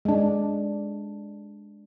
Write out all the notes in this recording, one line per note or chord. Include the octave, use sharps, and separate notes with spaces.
G#3 D4